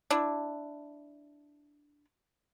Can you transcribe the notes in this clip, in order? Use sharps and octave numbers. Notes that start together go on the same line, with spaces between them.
D4 E4